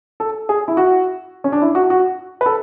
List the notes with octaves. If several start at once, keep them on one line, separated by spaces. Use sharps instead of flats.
A4
G#4
E4
F#4
C#4
D4
E4
F#4
F#4
B4
A4